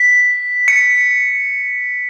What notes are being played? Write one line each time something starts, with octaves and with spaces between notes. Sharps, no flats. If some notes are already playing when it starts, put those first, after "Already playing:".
Already playing: B6
C#7